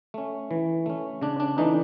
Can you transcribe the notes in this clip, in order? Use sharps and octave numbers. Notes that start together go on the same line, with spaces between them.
A3 C#4
E3
A3 C#4
C#3 D4
D4
E3 A3 D4 D#4